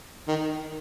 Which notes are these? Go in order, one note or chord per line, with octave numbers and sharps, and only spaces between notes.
D#3